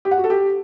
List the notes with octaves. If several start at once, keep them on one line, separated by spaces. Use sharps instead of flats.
G4
F#5
F#4
A4
G4